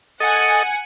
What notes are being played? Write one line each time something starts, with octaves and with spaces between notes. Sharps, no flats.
A4 D#5 F#5 G#5